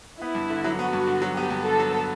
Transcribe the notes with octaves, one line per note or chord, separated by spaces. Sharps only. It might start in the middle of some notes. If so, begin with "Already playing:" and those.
B3 E4
G2
D3
F#3
B3 F#4
G2
D3
F#3
B3 G4
G2
D3 A4
F#3
B3